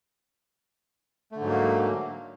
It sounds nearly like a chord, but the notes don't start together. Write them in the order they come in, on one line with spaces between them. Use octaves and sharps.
A3 D3 G#2 F#3 A#3